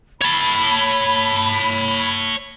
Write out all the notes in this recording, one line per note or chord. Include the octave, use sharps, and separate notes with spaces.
C#5 A5 B5